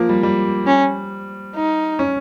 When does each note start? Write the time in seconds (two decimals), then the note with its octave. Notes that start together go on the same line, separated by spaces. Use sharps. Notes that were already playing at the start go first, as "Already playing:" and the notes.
Already playing: F3 A#3
0.09 G3
0.23 G3
0.67 C#4
1.55 D#4
1.99 C#4